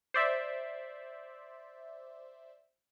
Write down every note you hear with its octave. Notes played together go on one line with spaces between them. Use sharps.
C5 D5 E5